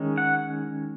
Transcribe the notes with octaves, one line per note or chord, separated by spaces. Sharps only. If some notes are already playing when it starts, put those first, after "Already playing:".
Already playing: D#3 G#3 C#4
F#5